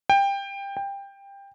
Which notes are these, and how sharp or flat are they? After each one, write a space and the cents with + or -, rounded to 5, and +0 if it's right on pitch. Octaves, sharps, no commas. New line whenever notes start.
G5 +20
G5 +20